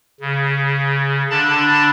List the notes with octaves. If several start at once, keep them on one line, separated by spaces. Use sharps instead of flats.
C#3
D3 D4 A5 B5 A6